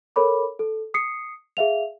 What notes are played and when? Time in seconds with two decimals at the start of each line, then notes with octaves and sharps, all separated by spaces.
0.16 A4 A#4 C#5 B5 D6
0.59 A4
0.94 D#6 C7 C#7
1.57 G#4 E5 F5 F7